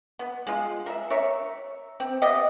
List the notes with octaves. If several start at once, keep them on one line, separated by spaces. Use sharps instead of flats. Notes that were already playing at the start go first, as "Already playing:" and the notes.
B3
G#3 F4
A#4 E5
A#4 C#5 E5
C4
B3 G4 D#5 E5